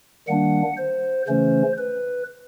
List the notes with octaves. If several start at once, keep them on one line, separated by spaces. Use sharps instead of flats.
D#3 G3 A#3 D4 F#5
C5
C#3 E3 A3 C#4 C5
B4